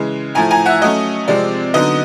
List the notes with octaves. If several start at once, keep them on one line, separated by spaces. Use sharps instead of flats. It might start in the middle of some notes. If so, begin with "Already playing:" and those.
Already playing: C#3 E3 G#3
A2 F3 A3 G#5 A#5
G#5 A#5
E5 F#5
F#3 A3 C#4 D#5
C3 F3 G#3 C4 D5
D3 F#3 B3 D#4 D#5